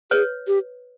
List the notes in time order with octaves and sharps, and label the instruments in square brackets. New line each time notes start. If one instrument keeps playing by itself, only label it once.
[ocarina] G#4 [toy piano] B4 C#5
[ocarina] G4